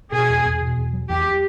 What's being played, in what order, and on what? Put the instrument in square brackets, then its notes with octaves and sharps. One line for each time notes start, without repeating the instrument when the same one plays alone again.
[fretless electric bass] B2 [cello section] G#4
[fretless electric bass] E2
E2
B2
E2
F#3
[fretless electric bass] E2 [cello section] G4